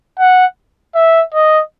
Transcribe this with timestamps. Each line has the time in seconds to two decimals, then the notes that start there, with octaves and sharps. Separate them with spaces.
0.19 F#5
0.95 E5
1.34 D#5